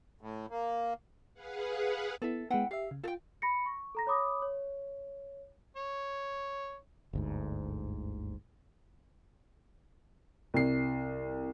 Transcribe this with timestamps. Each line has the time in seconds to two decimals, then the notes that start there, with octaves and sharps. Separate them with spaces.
0.21 A2
0.50 A#3
1.34 G#4 B4 F5 F#5
2.22 B3 E4 A4 E5
2.51 G#3 B3 E4 F#5 G5
2.71 G4 E5 F5
2.91 C#3
3.04 F4 A4 G5
3.42 B5 A#6 C#7
3.66 C#6
3.95 A4 A#5 A#6
4.07 C#5 B5 D6 D#6
4.42 C#5
5.76 C#5
7.13 G1 D2 G#2
10.54 C2 C7